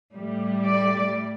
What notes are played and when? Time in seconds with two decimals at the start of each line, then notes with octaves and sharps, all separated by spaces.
0.13 A2 G3
0.66 D5